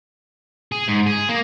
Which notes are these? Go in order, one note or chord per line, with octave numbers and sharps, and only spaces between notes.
G#4
G#2
G#4
A#3